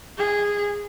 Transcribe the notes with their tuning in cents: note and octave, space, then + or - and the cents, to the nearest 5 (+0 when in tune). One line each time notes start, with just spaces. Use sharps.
G#4 -15